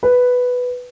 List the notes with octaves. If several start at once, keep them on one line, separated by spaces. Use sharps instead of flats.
B4